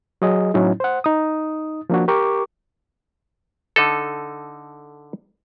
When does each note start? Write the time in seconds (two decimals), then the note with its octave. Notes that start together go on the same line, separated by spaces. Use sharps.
0.22 F#3 G#4 D#5
0.54 A2 F#3 C#4 D#4 E4
0.80 C5 F#5
1.04 D#4 D#6
1.90 F3 A#3 D4 F#4
2.08 G4 A#4 C#6 D6
3.76 D3 D#4 A4